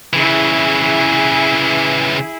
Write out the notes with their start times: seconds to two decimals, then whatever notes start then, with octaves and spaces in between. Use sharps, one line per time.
0.13 C#3 E3 E4 G#4